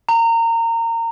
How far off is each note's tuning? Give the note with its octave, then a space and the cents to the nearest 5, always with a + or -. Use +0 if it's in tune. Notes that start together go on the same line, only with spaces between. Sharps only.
A#5 -25